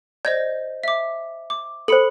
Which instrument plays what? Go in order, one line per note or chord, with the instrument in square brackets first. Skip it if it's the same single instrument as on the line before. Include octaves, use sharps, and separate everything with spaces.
[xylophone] C5 D#5 G6 [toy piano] D5
[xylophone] E5 D6
D6
[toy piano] A4 C5 [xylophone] B5 C#7 F#7